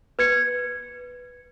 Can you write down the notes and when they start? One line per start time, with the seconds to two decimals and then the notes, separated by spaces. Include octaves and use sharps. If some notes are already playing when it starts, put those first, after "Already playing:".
0.19 B4 G#6 C#7